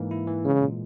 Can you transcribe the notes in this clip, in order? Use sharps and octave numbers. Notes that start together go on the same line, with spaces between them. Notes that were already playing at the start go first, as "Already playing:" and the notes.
Already playing: G#2 E3 A#3
E4
E3
C#3 G#3
A#2